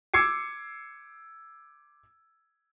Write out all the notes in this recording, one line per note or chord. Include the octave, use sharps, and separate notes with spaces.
D6 E6 G#6 C7 C#7